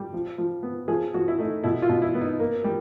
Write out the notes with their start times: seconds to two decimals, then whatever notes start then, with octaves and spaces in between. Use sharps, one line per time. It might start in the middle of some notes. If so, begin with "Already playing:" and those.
Already playing: G3
0.14 F3
0.38 F3
0.63 B3
0.88 F3 G#4
1.14 F3 F#4
1.28 E4
1.38 A3 D#4
1.64 B2 E4
1.82 F4
1.89 B2
2.02 E4
2.15 B3
2.21 D#4
2.39 A#3
2.64 G3